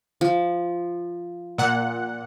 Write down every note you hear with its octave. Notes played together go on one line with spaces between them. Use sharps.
F3
A#2 F#5